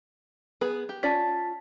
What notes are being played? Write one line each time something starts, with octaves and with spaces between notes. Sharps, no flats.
B3 G#4 B4
G4
C#4 F4 D5 A5 A6 B6